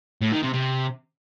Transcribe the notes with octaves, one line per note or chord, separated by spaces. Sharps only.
A2
D#3
C3
C3